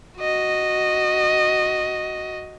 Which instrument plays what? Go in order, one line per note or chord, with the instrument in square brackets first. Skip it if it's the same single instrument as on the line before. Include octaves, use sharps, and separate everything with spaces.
[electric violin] F#4 D#5